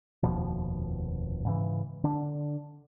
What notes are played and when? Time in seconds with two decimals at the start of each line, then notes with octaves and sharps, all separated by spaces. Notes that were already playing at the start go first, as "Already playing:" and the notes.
0.23 F1 D#2 B2 F3
1.45 G#2 C#3 E3
2.04 D3 D4